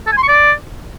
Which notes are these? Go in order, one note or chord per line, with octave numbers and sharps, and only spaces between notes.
A4
G#5
C6
C#6
D5